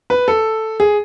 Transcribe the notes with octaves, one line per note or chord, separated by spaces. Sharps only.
B4
A4
G#4